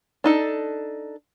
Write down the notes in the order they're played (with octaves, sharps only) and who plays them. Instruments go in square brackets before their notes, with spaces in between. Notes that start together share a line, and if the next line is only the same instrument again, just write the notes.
[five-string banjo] D4 D#4 A4